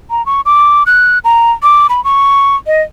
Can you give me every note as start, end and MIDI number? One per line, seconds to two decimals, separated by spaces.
0.10 0.24 82
0.26 0.41 85
0.46 0.83 86
0.86 1.19 90
1.24 1.51 82
1.63 1.87 86
1.89 2.03 83
2.04 2.56 85
2.67 2.81 75